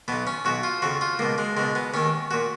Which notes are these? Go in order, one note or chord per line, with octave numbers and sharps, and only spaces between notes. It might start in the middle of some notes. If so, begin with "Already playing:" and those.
B1 B2 B3
C#4
B1 B2 F#4
F4
F2 C#3 F#4
F4
C#2 B2 A#3
G#3
C#2 B2 G#3
B3
D#2 D#3 C#4
A#2 F#4